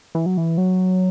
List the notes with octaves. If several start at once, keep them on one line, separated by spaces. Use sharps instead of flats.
E3
F#3
E3
F#3